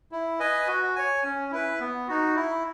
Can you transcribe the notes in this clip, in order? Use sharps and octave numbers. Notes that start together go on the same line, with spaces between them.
E4
B4 D#5 G#5
F#4
C#5 G#5
C#4
E4 B4
B3
D#4 F#4
E4